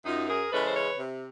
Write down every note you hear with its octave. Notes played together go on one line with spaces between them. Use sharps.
F#2 D#4 F4
G#4 A#4
C#3 E3 G#3 C#4 A4 B4
C5
B4 C#5
C3